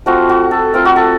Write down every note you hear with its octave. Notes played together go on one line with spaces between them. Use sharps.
F3 A3 C4 F4 F#4
F#4
A4
A3 C4 F4 A#4
F#4
A4